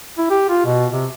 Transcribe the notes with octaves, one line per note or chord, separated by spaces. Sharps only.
E4
G4
F4
B2
C3